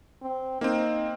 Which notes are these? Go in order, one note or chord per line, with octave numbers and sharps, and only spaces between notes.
C4
A#3 C4 D#4